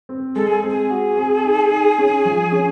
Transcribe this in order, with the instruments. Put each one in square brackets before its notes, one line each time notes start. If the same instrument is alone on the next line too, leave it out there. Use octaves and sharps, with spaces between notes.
[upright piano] C4
[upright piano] G#3 [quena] A4
[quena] G#4
[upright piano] C4
[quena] G#4
[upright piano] F#4
C4
D#4
D#4
C#4
F3
C#4